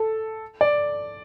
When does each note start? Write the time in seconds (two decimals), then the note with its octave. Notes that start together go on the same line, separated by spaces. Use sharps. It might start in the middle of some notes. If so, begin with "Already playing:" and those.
Already playing: A4
0.61 D5